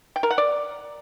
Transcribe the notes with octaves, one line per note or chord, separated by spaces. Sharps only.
G5
A#4
F#5
D5